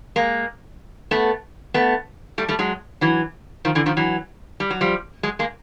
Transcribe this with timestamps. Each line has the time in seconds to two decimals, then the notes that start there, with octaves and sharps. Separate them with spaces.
0.16 G#3 A#3
1.11 A3 B3
1.74 A3 B3
2.38 G3 A3
2.48 G3 A3
2.59 F#3 G#3
3.01 E3 F#3
3.65 D#3 F3
3.75 D3 E3
3.86 D#3 F3
3.97 E3 F#3
4.60 G3
4.70 F#3
4.81 F3 G3
5.23 F#3 G#3
5.39 G#3 A#3